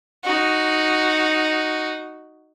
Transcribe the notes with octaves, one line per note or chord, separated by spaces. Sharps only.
D#4 F#4